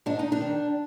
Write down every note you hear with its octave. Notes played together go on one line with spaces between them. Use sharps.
G#2 D4
D#4
D4
D#3